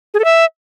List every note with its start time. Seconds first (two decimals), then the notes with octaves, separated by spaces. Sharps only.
0.14 G#4
0.19 A4
0.24 E5